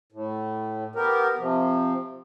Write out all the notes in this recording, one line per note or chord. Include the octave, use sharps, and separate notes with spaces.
A2
B3 G4 A#4
C3 F3